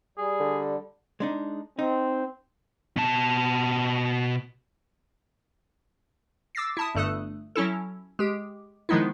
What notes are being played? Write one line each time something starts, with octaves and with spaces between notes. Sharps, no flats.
G3 G#4
D3
G#3 D4 D#4
C4 D#4
B2 A5
D6 E6 A6 A#6 C7
E4 A5 D#6
G1 G2 A3 A4 D#6 F#6
F#3 C#4 E4 A4
G#3 G4
D#3 F3 G#3 B3 D#4 E4